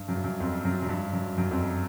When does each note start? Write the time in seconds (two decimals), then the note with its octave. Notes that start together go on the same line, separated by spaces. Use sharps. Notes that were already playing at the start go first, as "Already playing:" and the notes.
Already playing: G2
0.08 F#2
0.16 G2
0.24 F#2
0.40 F2
0.65 F#2
0.82 F#2
0.89 G2
1.13 F#2
1.38 F#2
1.51 F2